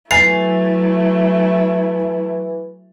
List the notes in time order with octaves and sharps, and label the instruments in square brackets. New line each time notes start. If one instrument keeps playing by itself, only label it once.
[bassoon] E3 [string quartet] F#3 A3 E4 [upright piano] G#5 A6 F7 [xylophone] C7